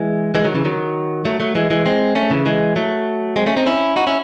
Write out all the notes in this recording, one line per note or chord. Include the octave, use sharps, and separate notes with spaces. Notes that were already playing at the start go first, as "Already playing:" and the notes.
Already playing: E3 G#3
E3 G#3
D#3 F#3
C#3 E3
D#3 F#3
F#3 A3
F#3 A3
E3 G#3
E3 G#3
G#3 C4
A3 C#4
C#3 E3
E3 G#3
F#3 A3
G#3 C4
A3 C#4
C4 D#4
C#4 E4
D#4 F#4
C#4 E4